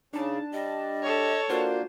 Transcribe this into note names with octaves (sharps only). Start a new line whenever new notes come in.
C#3 D4 D#4 A5
G3 D#5
A4 C#5
A#3 D4 F4 F#4 A#4 C5